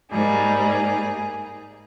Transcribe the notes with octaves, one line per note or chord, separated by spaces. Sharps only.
G#2 G3 A#3 G#4